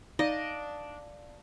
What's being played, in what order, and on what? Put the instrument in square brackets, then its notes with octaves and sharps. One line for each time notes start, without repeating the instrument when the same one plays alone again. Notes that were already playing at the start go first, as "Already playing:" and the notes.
[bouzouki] D4 [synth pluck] D#4 [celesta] D5 F5 [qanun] D#5